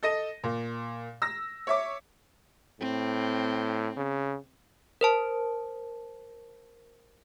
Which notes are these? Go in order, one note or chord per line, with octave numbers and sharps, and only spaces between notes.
A4 D#5 A#6 D#7
A#2
E6 A#6
C#5 E5 D6
A2 C4
C#3
A#4 C5 A5